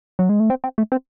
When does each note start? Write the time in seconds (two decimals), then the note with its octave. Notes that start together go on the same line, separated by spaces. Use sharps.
0.19 F#3
0.29 G#3
0.40 A3
0.50 C4
0.64 C4
0.78 A3
0.92 C4